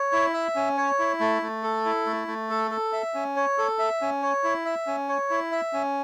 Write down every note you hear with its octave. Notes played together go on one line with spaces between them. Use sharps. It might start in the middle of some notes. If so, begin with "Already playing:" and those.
Already playing: C#5
E4
E5
C#4
C#5
E4
A3
A3
A4
E4
A3
A3
A4
A4
E5
C#4
C#5
A4
E5
C#4
C#5
E4
E5
C#4
C#5
E4
E5
C#4